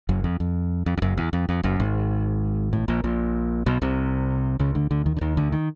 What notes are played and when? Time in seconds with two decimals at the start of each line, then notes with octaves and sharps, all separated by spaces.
0.09 F#1 F#2
0.24 F2
0.40 F2
0.86 F2
0.97 F2
1.02 F#1 F#2
1.17 E2
1.33 F2
1.49 F2
1.63 F#1 F#2
1.80 G#1 G#2
2.73 A1 A2
2.88 A#1 A#2
3.04 A#1 A#2
3.66 B1 B2
3.82 C2 C3
4.59 C#2 C#3
4.75 D2 D3
4.91 D2 D3
5.06 D#2 D#3
5.17 D3
5.21 D#2 D#3
5.37 D2 D3
5.52 D#3